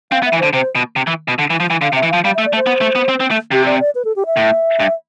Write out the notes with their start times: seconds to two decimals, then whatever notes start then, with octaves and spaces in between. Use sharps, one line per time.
0.11 C4 F5
0.22 B3
0.26 E5
0.33 E3
0.39 D3 C5
0.53 C3 C5
0.75 B2
0.96 C3
1.07 E3
1.28 B2
1.39 D3
1.50 E3
1.60 F3
1.70 E3
1.81 D3 F5
1.93 C3
1.95 E5
2.03 E3
2.10 F3 F5
2.24 G3 F5
2.35 E5
2.38 A3
2.46 D5
2.53 A3
2.56 C5
2.66 B3
2.81 A3
2.95 B3
3.09 C4
3.20 C4
3.31 A3
3.51 C3 G4
3.66 D5
3.80 D5
3.95 B4
4.05 A4
4.16 G4
4.26 E5
4.37 A2
4.80 G2